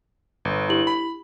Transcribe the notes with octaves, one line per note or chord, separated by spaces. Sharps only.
G1
E4 G4 F#7
B5